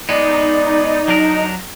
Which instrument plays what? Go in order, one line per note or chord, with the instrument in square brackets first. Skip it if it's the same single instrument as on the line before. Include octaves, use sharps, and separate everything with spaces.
[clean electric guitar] G#3 B3 [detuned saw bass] D#4 [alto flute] D5
[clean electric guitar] F#3 D4 A#4